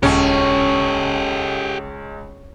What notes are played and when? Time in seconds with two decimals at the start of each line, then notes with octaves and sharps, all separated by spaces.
0.03 D#1 C#2 C#4 G4 A4